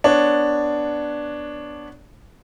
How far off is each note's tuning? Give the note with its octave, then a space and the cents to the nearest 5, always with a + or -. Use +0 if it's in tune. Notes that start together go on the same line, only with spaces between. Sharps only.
B3 +0 D4 +0 C#5 +0